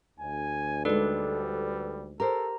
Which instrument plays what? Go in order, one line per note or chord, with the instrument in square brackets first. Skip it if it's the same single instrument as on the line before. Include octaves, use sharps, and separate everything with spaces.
[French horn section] D2 [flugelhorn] G#5
[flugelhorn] G3 [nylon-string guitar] G#3 D#4 [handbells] A4 B4 D5
[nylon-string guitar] G4 A#4 C5 [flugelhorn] A4 [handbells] A#5